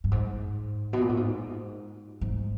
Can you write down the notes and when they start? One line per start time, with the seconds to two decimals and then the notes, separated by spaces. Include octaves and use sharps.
0.04 G2
0.11 G#2
0.93 B2
1.01 A#2
1.09 A2
1.17 G#2
2.21 G#2